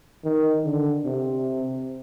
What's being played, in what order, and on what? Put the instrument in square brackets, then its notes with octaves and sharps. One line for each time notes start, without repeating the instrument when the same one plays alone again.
[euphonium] D#3
D3
C3